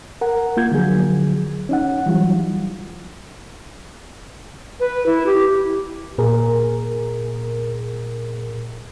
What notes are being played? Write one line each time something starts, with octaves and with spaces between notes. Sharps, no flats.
A#4 F#5
A#3 F4 G6 G#6
D3 F3 F#3 G#4
C#4 D#4 F#5
E3 F#3 G3 F4
B4
E4
G4
A#2 G#4 A#4